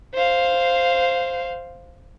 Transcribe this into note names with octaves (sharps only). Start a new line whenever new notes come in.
C5 F5